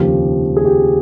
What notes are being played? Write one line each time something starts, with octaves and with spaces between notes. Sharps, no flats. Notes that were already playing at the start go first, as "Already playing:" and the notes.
Already playing: F1 D#2 C#3 F3 G4
G#4
G4